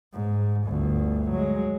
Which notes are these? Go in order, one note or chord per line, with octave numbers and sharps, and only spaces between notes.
G#2
G1 D2
F#3 G#3